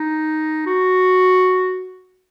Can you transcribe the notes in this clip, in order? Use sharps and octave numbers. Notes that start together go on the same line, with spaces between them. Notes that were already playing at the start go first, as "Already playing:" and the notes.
Already playing: D#4
F#4